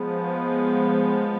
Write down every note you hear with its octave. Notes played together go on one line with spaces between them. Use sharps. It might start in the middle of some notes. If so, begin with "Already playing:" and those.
Already playing: F3 G#3 B3